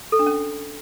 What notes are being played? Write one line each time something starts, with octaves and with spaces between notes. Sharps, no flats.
A4
D4
C#4